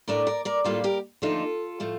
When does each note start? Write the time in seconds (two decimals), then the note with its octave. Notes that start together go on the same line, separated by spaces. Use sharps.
0.08 A2 A3 D4 A#4 D5
0.27 A#4 D5
0.45 A#4 D5
0.64 A2 G3 A#3 D4 F4 A4
0.84 G4 A#4
1.22 D#2 D3 F3 A3 D#4 F4 A4
1.80 A2 F3 A3